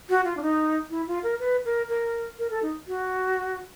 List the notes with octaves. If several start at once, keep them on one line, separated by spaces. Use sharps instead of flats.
F#4
F4
D4
D#4
E4
F4
A#4
B4
A#4
A#4
A#4
A4
D#4
F#4